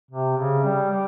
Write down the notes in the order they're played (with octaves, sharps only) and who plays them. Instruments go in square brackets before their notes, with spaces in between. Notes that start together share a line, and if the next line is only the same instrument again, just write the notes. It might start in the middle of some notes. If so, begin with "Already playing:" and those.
[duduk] C3
C#3
G3
G3